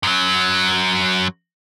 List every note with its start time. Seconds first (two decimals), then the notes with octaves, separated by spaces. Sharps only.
0.03 F#2 F#3